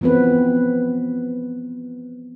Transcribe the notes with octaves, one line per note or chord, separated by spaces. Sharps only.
E3 F3 B3 C4 B4